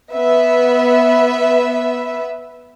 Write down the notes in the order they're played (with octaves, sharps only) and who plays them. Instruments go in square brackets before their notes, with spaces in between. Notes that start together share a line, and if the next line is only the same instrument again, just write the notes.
[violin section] B3 B4 E5